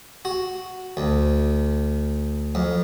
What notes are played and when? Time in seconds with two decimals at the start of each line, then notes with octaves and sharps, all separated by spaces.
0.25 F#4
0.97 D2
2.55 F2